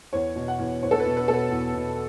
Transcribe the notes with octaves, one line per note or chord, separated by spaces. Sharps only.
E2 C#5
B2
F#5
E2
E2 C#5
A4
B4
B2
B4
B2 A4
B4
E2
B2